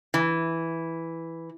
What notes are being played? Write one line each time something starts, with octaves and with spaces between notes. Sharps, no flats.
E3